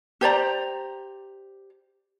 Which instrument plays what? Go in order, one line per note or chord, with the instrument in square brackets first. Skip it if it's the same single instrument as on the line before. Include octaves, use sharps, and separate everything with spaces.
[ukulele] G4 C5 D5 A#5